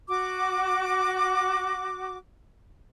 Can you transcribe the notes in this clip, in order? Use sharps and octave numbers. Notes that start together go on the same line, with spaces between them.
F#4 D6